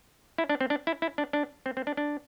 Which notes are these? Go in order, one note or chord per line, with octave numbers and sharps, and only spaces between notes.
E4
D4
C4
D4
E4
E4
D4
D4
C4
C4
D4
D4